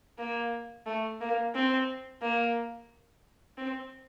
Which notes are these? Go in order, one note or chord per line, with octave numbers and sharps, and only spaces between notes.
A#3
A3
A#3
C4
A#3
C4